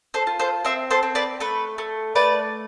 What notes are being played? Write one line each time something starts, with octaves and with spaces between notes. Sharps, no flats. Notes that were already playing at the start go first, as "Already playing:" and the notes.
A4 C5
F4
A4 C5
C4 C5 E5
A4 C5
C4
B4 D5
A3 B4
A3
A3 B4 D5